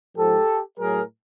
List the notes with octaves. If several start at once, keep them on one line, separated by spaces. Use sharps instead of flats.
G#2 F3 G4 A4
A2 F#3 G#4 A#4